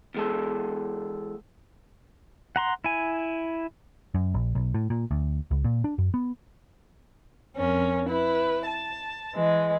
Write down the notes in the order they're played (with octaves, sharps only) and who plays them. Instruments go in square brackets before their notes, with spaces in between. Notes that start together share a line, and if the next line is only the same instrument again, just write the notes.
[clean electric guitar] E2 G#3 A4
[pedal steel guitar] F#5 A#5 C6
E4 G#5
[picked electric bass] F#2
A#1
B1
A2
A#2
D2
C#2
A#2
D4
F#2
B3
[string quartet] F2 C#4 A#4
E4 B4
A5
E3 G#3